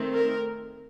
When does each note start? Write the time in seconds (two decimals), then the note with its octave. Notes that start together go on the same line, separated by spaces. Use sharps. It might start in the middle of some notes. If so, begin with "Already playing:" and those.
Already playing: D#3 A3 C4
0.13 A#4